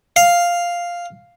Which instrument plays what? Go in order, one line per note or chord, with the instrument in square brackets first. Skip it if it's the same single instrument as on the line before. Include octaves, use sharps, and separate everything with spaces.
[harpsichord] F5